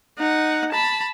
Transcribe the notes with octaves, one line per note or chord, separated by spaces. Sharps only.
D#4 F#5
A5 B5